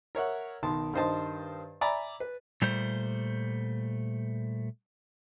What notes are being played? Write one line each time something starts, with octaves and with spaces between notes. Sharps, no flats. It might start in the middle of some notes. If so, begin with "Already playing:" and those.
A#4 C#5 E5 F#5
B1 D#3 A5 C6
G2 D#3 C5 D#5 A5 C6
D5 E5 G#5 A#5 B5
B4
A#2 G3 A3 C5